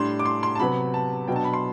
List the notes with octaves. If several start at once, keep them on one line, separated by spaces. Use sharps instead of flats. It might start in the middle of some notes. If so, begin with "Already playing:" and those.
Already playing: A2 G3 D4 C6
D6
C6
C6
A5
C3 F#3 B3 B5
A5
B2 F#3 B3 D4 G5
A5
B5
C6